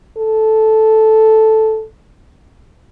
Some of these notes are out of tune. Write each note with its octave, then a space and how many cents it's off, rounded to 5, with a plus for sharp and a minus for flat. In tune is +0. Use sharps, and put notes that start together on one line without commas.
A4 -5